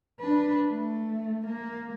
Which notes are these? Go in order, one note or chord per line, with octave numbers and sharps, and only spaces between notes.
D4 B4
A3
A#3